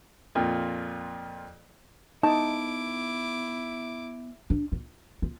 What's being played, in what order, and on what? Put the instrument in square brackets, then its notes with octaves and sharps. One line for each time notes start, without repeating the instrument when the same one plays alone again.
[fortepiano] F2 A#2 F4
[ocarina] B3 [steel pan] D#4 [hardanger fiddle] E4 D6 [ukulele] A5
[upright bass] D4
F4
F4